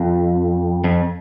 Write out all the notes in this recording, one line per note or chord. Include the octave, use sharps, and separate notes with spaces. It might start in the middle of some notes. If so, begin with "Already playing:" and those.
Already playing: F2
F2